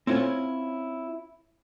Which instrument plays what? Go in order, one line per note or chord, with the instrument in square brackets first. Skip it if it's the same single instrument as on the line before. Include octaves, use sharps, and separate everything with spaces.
[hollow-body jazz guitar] C4 C#4 E4 F4 C#5